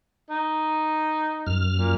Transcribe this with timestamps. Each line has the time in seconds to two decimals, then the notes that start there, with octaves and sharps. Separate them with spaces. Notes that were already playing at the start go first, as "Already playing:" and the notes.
0.30 D#4
1.47 F#2 F6
1.77 A#2